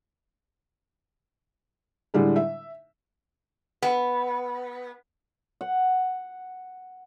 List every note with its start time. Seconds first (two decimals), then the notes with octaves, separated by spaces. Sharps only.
2.14 A2 D3 G3 G#3
2.36 E5
3.82 B3
5.61 F#5